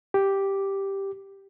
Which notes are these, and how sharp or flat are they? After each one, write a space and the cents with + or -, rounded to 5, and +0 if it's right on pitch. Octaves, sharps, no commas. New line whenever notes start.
G4 +0 D6 +0